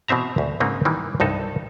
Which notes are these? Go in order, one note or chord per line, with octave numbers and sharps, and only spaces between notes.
B2 E3 C4 E5 A#5
D2
G#2 C#3 A#3 C4 D#4
D#3 E3 G3 A#3
C2 G2 D#4 A4